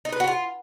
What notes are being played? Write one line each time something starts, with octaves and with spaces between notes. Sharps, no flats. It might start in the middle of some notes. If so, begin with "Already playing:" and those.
D#4
B4
F#4
F4